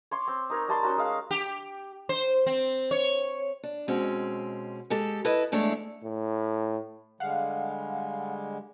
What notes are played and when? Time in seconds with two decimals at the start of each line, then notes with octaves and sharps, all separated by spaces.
0.11 C#5 C6 D6
0.28 C4
0.50 D#4 A#4 C#5
0.68 G3 A5 C6
0.83 C#4 F#4 A#4
0.98 G#3 F5
1.31 G4
2.09 C5
2.46 C4
2.91 C#5
3.63 D4
3.88 B2 G#3 C4 C#4
4.90 G#3 G4 A4
5.25 E4 A4 B4 D#5
5.52 E2 G#3 A3 D4 E4 C#5
6.04 A2
7.20 D3 G3 G#3 F5 F#5